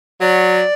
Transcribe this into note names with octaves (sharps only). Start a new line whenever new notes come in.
F#3 D5